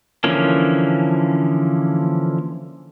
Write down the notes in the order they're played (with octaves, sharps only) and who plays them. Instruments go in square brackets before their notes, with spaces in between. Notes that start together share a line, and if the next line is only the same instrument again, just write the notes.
[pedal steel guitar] D3 E3 F3 A#3 C#4